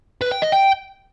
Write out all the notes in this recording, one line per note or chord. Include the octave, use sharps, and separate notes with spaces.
B4
G5
D#5
G5